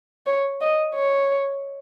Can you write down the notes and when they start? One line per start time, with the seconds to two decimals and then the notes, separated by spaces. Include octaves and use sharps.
0.26 C#5
0.61 D#5
0.95 C#5